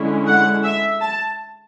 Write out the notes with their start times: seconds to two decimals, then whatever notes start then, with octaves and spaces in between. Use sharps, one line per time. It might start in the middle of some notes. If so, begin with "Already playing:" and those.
Already playing: D3 G#3 C#4 E4
0.26 F#5
0.64 E5
1.01 A5